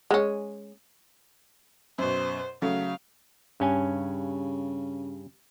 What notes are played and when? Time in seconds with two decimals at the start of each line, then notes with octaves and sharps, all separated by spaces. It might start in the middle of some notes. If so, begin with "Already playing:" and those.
0.11 G#3 C#4
1.98 F#2 B2 C5
2.62 C#3 F#3 A3 F5
3.60 G2 C#3 C#4 G#5